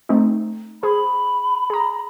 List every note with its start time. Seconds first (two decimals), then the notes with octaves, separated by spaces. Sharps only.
0.09 A3 C4 D#4
0.83 G#4 C5 B5
1.70 G#4 A#5